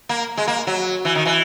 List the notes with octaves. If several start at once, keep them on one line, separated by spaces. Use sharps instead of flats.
A#3
G#3
A#3
F#3
E3
D#3
E3